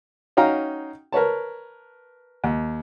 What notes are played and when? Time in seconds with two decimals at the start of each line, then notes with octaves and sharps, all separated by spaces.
0.37 C#4 D#4 F#4 F5 G5 A#5
1.13 A#4 B4 C#5 A5
2.44 D#2